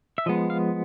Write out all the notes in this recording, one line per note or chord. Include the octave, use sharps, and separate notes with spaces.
E5
F3 G#3 B3 D#5
F5